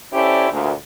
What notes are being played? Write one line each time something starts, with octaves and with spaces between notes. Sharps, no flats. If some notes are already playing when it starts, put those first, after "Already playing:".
C#4 E4 G4 A4 C5 D5
D2 A#2